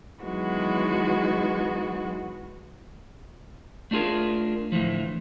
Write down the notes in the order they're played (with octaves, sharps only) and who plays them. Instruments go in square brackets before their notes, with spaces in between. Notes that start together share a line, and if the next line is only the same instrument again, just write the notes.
[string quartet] D#3 E3 F#3 G#3 B3 F#4
[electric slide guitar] A3 D4 F4 G#4 A#4
A2 D3 E3 F3